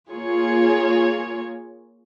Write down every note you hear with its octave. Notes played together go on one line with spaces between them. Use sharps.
A#3 F4 G#4 C#5